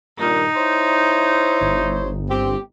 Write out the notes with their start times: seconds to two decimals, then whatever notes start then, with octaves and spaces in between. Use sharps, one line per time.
0.19 G2 A#2 D#3 D#4
0.56 E4 C5 C#5
1.61 G1
2.29 C4 G4